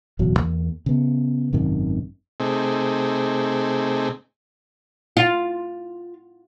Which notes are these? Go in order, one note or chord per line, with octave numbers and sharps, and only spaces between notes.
D1 E2 B2 F#3
E2 A#3
C#3 B3
G#1 F#2 C3 D#3
C3 A3 C4 D#4 G#4
F4